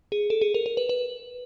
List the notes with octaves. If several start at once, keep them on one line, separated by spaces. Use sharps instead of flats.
G#4
A4
G#4
A#4
A#4
B4
B4